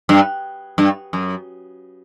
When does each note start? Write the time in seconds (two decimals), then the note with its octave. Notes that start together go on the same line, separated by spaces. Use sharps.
0.09 G2
0.78 G2
1.13 F#2